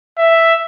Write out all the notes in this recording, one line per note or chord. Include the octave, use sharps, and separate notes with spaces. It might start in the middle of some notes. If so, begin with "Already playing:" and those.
E5